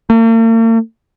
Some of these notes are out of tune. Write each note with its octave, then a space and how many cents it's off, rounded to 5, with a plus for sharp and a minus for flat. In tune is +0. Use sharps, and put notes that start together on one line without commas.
A#3 -45